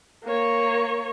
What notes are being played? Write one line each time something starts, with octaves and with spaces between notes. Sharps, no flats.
A#3 C#5